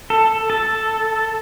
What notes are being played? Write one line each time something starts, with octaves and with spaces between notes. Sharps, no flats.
A4
A4